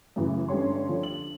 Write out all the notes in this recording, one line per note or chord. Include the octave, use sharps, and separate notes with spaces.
F#2 A2 C#3 E3
G2 D3 C#4 G4 C#5 C6
D3 F3
F#7